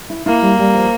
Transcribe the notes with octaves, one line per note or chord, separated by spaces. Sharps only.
E4
A#3 E4
G3
G3
F3